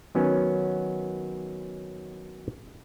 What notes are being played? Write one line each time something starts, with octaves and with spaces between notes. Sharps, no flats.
D#3 F#3 B3 C#4